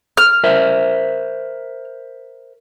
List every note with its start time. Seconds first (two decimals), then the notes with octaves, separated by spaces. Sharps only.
0.17 F6
0.44 A#4 C5 E5